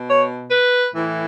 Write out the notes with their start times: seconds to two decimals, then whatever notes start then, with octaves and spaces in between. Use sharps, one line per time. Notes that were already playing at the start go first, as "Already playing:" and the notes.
Already playing: B2
0.10 C#5
0.51 B4
0.93 A2 E3